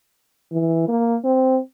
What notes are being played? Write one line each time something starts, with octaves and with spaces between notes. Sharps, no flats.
E3
A#3
C4